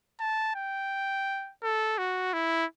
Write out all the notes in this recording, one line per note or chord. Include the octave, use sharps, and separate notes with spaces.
A5
G5
A4
F#4
E4